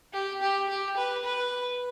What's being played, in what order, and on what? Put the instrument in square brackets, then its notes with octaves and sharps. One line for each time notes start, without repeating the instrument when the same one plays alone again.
[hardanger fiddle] G4
G4
G4
B4
B4